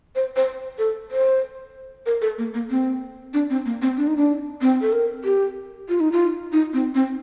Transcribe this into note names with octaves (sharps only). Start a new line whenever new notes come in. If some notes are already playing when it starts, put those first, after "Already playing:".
C5
C5
A4
C5
A#4
A4
A#3
A#3
C4
D4
C4
A#3
C4
D4
D#4
D4
C4
A4
A#4
G4
F4
D#4
F4
D#4
C4
C4